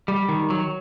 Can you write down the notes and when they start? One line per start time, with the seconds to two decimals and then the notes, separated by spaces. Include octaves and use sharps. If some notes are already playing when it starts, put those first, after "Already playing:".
0.08 G3
0.29 D#3
0.50 F#3